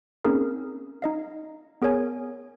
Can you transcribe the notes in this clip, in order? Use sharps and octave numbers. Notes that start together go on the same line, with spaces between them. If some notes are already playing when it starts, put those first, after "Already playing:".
A#3 C4 C#4 D#4 G#4 A#4
D#4 D#5 F5
B3 G#4 A#4 C#5 G#5